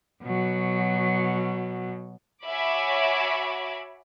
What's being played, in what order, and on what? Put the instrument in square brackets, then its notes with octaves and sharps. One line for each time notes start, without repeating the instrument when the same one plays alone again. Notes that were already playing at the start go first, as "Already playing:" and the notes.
[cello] B2 F#3
[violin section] F#4 C#5 E5 G#5 B5 D6